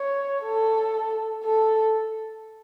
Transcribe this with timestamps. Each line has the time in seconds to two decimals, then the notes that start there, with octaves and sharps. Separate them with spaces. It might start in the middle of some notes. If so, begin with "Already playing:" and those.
Already playing: C#5
0.42 A4
1.44 A4